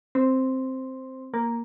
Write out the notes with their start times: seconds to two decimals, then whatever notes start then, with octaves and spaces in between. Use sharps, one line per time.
0.15 C4
1.34 A#3